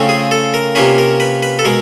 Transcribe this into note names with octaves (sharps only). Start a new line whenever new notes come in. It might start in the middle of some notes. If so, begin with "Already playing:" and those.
Already playing: C#3 F3 A3 C4
G#4
A4
A#4
C3 F3 A#3 C#4 B4
A#4
B4
B4
A4
B2 G#3 A#4